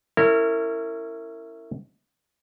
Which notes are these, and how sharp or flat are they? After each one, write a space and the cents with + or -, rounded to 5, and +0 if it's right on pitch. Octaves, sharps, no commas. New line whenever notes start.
C#4 -5 E4 +0 A#4 -35